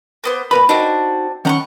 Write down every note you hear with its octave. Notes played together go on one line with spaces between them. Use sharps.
A#3 B3 C5
A#2 A#4 B4 B5
C4 D4 D#4 F#4
D#3 C#4 F#5 G5 A#5 C#6